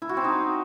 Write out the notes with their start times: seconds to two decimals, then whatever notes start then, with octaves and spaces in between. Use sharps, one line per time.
0.02 E4
0.09 F#4
0.17 C4
0.24 D#4